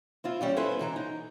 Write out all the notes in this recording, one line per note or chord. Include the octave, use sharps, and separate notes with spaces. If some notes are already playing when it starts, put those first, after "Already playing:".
C4 E4 F4
E3 G3 C#4
B3 C#4 E4 A4 B4 C5
G#2 E3 A#5
D#4